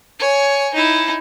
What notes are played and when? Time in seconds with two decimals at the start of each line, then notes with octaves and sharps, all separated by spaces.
0.19 C#5 G#5
0.74 D#4 E4